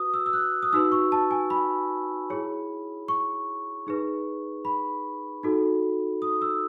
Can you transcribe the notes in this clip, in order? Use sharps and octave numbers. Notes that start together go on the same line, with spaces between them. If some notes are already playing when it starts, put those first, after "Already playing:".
Already playing: F#4 B4 D#6
E6
E6
F#6
D#6
D#4 F#4 B4 E6
C#6
A5
G#5
B5
E4 G#4 C#5
C#6
D#4 G#4 B4
B5
D#4 F#4 A4
D#6
E6